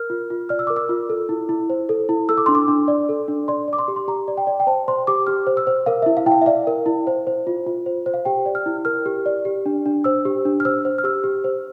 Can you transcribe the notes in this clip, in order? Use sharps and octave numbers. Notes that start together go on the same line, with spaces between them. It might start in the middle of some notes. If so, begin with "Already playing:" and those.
Already playing: A#4 F6
F4
F4
D5 F6
E6
A#4 D6
E6
F4
A4
E4
E4
C5
A4
E4
A4 E6
D6
D4 C6
D6
D4
D5
A4
D4
D5 C6
D5
D6
C6
G4
C6
G4 A#5
D5
G5
D5
G5
C5 A5
C5 C6
G4 D6
G4 F6
C5
E6
C5
A#4 F5
E4 E5
F5
E4 G5
F5
E5
D5 F5
A#4
E4
C5
C5
F4
F4
C5
C5
F5
G4 G5
D5
F6
E4
A#4 F6
G4
D5
G4
D4
D4
C5 E6
G4
D4
F6
C5 E6
C5
F6
G4 E6
G4
C5